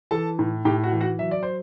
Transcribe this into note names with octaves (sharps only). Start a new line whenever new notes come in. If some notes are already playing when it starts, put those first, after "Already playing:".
E3 A4 A5
A2
A2 G4 G5
F#4 F#5
E3
F#4 F#5
F#3 E5
D5
C5